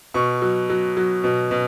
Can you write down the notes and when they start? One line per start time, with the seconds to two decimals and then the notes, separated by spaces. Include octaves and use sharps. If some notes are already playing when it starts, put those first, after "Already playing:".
0.14 B2 C#6
0.42 F#3
0.70 F#3
0.97 F#3
1.24 B2
1.51 B2